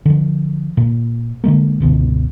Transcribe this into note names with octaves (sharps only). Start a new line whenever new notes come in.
D3 F3
A#2
D3 E3 G#3 A#3
G1 C#2 B2 D3